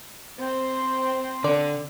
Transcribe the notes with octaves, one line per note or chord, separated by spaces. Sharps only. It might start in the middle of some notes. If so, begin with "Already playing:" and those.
C4 C5
D3 D5